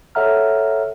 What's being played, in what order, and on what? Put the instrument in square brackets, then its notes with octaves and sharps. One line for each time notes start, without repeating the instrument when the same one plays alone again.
[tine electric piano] A4 C#5 E5 F#5 A#5 F6